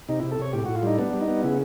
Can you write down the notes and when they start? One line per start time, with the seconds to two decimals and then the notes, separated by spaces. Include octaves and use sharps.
0.09 C3 D#4
0.20 C3 E4
0.31 A4
0.39 C3 C#5
0.53 A2 G4
0.65 A2 F#4
0.75 F4
0.83 G3 D#4
0.98 B3 D4
1.13 G3
1.21 D#4
1.28 B3
1.43 C#3 E4